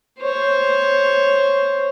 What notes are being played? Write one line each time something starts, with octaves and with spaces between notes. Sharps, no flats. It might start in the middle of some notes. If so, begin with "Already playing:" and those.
C5 C#5